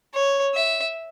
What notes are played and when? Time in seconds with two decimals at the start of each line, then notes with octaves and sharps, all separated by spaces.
0.15 C#5
0.55 E5